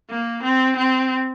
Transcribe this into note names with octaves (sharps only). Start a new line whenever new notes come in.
A#3
C4
C4